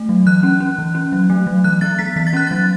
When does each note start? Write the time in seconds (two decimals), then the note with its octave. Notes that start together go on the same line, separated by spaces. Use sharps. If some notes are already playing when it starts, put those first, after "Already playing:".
Already playing: A3
0.09 F#3
0.26 E3 F#6
0.43 C#4
0.60 C#4
0.78 E3
0.95 C#4
1.12 F#3
1.30 A3
1.47 F#3
1.64 E3 F#6
1.81 B3 A6
1.99 B3 B6
2.16 E3 B6
2.27 A6
2.33 C#4 F#6
2.47 F#3 A6